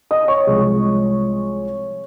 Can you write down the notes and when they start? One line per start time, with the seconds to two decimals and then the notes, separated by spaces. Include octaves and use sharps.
0.11 D#5 D#6
0.28 C#5 C#6
0.47 C2 C3 F3 G#3